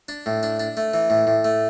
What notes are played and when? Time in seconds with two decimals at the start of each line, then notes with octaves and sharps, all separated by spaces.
0.09 D4
0.26 A2
0.43 D4
0.60 D4
0.77 A3
0.94 E3
1.10 A2
1.27 A2
1.45 A3